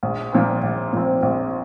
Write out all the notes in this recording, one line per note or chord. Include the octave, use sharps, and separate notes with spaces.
A#1
A#2 F3 C4
A#1
A#2 F3 C4
A#1